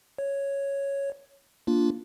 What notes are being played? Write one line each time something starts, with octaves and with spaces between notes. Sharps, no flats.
C#5
A#3 D4 F4